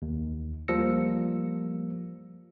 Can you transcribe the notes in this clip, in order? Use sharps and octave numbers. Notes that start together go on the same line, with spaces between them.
D#2
F3 G3 A#3 E6 A#6 C#7